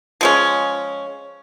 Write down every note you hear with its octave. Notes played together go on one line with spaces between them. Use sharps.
F3 G#3 C#4